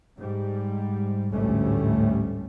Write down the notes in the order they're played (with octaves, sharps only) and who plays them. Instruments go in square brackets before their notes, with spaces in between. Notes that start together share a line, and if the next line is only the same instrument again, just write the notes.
[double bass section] G#2 G3
A1 D2 G#2 G3 A3 C#4